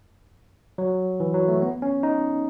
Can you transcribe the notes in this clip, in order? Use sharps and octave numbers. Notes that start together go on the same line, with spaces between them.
F#3
E3
F#3
A3
B3
C#4
D#4